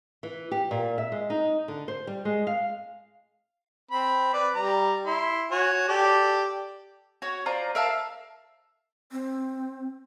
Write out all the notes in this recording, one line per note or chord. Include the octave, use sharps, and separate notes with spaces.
E3
G4
A#2
E5
G#3
D#4
D3
C5
G3
G#3
F5
C4 B5
B4 D5
G3 A#5
E4 C6
F#4 C#5 G#5
G4 A4 D5
F#4 C#5
F4 C5 D5 A#5
A#4 E5 F5 A5
C4